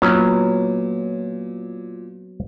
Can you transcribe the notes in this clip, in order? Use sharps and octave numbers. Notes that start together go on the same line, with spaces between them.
A#2 F#3 B3 C#4